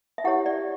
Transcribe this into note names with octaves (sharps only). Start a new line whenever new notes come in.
E5
E4 G4 C#5 F#5
D5